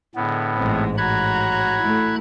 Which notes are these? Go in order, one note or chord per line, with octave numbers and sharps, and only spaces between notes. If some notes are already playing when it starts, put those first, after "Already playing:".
A2 D3 G#3 B3
A1 G#2 G#3 A3 C4
F#4 C#5 A#5 B5 F#6 G#6
A3 E4